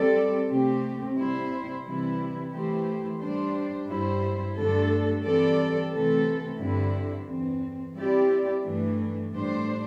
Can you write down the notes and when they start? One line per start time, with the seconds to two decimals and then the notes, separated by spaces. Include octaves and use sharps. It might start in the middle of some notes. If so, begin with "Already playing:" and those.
Already playing: G3 C4 A4 D5
0.48 C3 A3 C4 G4
1.17 C3 G3 E4 C5
1.85 C3 E3 G3 E4
2.53 E3 A3 E4 G4 C5
3.20 G3 D4 C5
3.88 G2 G3 E4 C5
4.56 G2 D3 A3 D4 A4
5.24 E3 G3 C4 A4 D5
5.92 C3 E3 A3 C4 A4
6.59 G2 D3 C4 E4
7.27 E2 E3 C4
7.95 G3 C4 E4 G4 D5
8.63 G2 E3 A3 D4
9.30 A2 G3 D4 C5